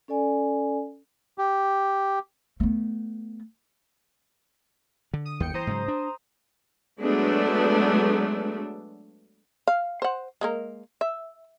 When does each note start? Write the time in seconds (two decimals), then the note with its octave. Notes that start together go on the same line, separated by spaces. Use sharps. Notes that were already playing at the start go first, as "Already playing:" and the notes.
0.08 C#4 A4 D5 G#5
1.38 G4
2.60 A3 B3
5.14 D3
5.25 D#6
5.40 G1 D#2 G5 C#7
5.54 E3 C5 A#5 D#6
5.67 G#2 C#3 F#3
5.88 D4
7.00 F#3 G#3 A3 B3 D4
9.68 F5
10.02 C5 F#5
10.41 G#3 A#3 A#4
11.01 E5